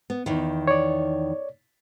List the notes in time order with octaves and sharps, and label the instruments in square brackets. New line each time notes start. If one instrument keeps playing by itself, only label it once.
[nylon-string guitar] B3
E2 D#3
[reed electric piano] C#5 D5